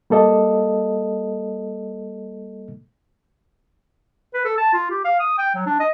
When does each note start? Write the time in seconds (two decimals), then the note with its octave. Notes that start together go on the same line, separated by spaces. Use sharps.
0.10 G3 A#3 A4 D#5
4.34 B4
4.45 A4
4.58 A5
4.73 F4
4.91 G4
5.05 F5
5.20 D#6
5.38 G5
5.55 F#3
5.66 D4
5.80 D#5